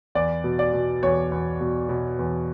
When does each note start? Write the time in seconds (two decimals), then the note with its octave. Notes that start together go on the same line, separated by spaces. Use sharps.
0.15 E2 D5
0.44 B2
0.59 D5
0.73 B2
1.02 E2 C#5
1.32 E2
1.61 B2
1.89 B2
2.19 E2